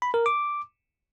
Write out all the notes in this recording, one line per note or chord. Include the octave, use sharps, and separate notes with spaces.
B5
A#4
D6